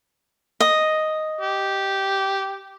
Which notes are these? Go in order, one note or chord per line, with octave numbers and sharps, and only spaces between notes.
D#5
G4